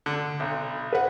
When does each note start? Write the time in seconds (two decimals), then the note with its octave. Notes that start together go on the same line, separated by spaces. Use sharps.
0.06 D3
0.40 B1
0.93 B4 F#5